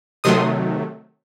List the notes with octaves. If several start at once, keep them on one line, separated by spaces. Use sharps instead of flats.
C3 D#3 F#3 A3 C6 D#6